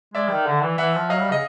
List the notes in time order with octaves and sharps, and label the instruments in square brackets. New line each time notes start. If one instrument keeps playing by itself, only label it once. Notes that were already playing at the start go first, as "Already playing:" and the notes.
[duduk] G#3 [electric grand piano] D5 E5
[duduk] D#3
D3
E3
[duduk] E3 [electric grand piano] E5 F#5
[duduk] F3
[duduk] F#3 [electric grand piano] D#5 F5
[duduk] G3
[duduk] C#3 [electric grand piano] D#5